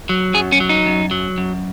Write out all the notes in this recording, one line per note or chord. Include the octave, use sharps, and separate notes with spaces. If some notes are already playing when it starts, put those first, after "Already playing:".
F#3
F#2 G#4
C#4
F#3
D#4
F#2
F#3
F#2